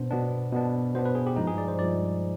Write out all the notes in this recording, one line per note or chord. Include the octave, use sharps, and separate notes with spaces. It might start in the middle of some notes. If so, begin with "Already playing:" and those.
Already playing: B2 B3 D4 C5
B2 B3 D4
B2 B3 D4
B2 B3 D4 C5
B4
G#4
G4
G2 F3 G#3 D#4
G#4
D5
C5
G2 F3 G#3 D5